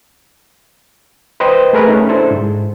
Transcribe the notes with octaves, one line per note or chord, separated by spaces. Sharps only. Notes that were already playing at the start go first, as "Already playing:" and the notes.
B4 C5 D#5 G5
A3 G#4 A#4 B4
A3 C#4 D#4
D4 E4 A4 C5
G#2